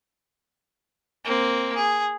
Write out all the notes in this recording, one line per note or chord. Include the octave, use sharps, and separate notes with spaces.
A#3 C4
G#4